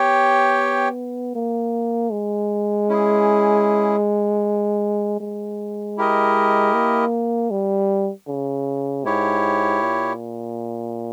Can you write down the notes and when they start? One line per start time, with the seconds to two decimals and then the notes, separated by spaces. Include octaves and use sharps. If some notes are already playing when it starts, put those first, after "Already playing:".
Already playing: B3 G4 C#5 G5
1.35 A#3
2.12 G#3
2.89 C#4 E4 G#4
5.20 G#3
5.97 E4 G4 A#4 D#5
6.73 A#3
7.51 G3
8.28 C#3
9.05 G#2 E4 G4 C#5
9.82 A#2